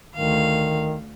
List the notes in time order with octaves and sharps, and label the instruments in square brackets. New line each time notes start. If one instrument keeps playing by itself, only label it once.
[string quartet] D2 F5 [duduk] D#3